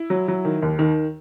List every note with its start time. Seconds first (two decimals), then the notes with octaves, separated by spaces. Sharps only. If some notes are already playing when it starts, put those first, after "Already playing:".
Already playing: E4
0.10 F#3
0.28 F#3
0.45 D#3
0.62 D#2
0.79 D#3